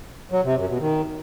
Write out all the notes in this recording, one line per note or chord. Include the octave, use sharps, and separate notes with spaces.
F#3
C3
F#2
B2
D#3